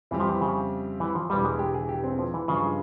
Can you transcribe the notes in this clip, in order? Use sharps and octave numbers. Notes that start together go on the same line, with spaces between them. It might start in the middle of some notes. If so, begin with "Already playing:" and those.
F2 C3 E3 G3 C4 G4
F3
E3
C#3
E3
F3
E1 E2 E3 G3
G#3
G4
G#4
G4
C4
F3
E3
G2 C#3 F3 G#3